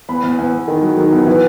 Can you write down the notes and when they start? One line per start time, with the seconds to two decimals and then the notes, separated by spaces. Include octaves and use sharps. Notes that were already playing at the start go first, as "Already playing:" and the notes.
0.09 E2 B5
0.24 E2
0.39 E2
0.53 E2
0.68 D#3
0.83 F#3
0.97 D#3
1.12 E2
1.27 E3